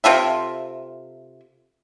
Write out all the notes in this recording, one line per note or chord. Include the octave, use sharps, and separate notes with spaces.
C3 F4 A4 E5